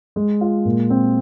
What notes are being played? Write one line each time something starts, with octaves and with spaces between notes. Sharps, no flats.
G#3
F4
A#2
C4